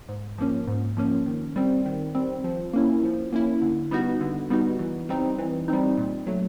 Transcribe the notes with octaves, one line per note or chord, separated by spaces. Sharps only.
G#2
F3 A#3 C#4
G#2
F3 A#3 C#4
D#3
G3 C4
D#3
G3 C4
F3
A#3 C#4 E4
F3
A#3 C#4 E4
D3
G3 B3 D#4 F#4
D3
G3 B3 D#4 F#4
E3
G3 C4 D#4
E3
G3 C4 D#4
A#2
F#3 A3